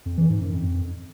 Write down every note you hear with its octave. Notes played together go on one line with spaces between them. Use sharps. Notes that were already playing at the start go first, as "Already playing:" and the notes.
F2
E3
G#2
F#2
F2